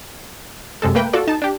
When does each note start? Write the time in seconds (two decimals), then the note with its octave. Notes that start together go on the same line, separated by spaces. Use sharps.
0.82 F#2 C3 G#3 A4
0.95 A3 A#3 B4 G5
1.13 F4 F#4 A4 D5
1.28 D#4 A5
1.42 D4 G4